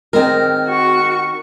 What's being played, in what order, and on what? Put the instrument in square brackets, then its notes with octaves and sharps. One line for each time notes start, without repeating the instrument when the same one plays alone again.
[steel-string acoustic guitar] D#3 A#4 [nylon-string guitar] G#3 C4
[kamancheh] F#4 C#6